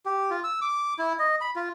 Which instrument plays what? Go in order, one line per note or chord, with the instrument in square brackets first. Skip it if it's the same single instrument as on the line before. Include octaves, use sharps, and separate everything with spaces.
[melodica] G4
F4
E6
D6
E4
D#5
B5
F4